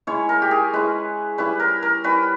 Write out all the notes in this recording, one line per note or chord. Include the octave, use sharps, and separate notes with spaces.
G#3 C#4 E4 C#5
A#4
G4
G#4
G#3 C#4 E4 B4
G3 C#4 E4 B4
A#4
A#4
G3 C#4 E4 B4